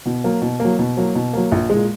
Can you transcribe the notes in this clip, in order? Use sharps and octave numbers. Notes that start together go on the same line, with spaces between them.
B2
F#3 A#3
B2
F#3 A#3
B2
F#3 A#3
B2
F#3 A#3
A#1
A#2 G#3